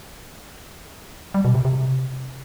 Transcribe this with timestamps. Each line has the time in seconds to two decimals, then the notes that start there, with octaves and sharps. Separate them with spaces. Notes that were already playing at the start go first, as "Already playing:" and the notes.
1.34 G3
1.45 B2
1.55 C3
1.65 C3